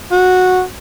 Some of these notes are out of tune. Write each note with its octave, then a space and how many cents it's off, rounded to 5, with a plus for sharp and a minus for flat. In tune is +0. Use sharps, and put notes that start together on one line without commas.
F#4 -10